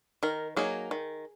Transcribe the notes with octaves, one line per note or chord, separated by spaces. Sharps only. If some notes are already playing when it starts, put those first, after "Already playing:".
D#3 A#4
F#3 A#3 D#4 G#4
D#3